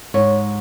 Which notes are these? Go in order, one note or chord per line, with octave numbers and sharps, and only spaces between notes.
G#2 C#5